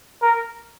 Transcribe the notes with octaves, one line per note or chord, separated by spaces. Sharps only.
A#4